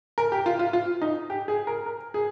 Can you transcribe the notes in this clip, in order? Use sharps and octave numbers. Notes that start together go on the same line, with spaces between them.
A#4
G4
F4
F4
F4
D#4
G4
G#4
A#4
A#4
G#4